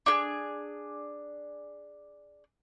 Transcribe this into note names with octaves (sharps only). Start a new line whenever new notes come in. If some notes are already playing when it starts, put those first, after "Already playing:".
D4 F#4 G#4